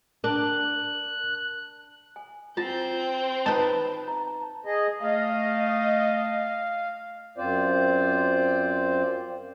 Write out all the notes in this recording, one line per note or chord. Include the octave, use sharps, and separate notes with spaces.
D4 A#4 F#6
G#5
C4 F4 A5 G6
D#4 B4 A5
A#5
G#4 D#5
A3 D#5 F5
F#2 C4 F4 C5 D5